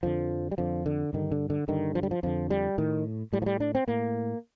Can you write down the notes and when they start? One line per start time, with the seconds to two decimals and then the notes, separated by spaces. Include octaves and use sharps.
0.03 F2 D3 F3
0.51 G3
0.58 F2 D3 F3
0.86 D3
1.13 G2 D3 D#3
1.32 D3
1.50 D3
1.68 G2 D3 D#3
1.95 F3
2.03 G3
2.11 F3
2.23 F2 D3 F3
2.50 G3
2.78 A2 D#3
3.33 A2 G3
3.42 F3
3.46 G3
3.60 D4
3.75 C4
3.88 A2 A#3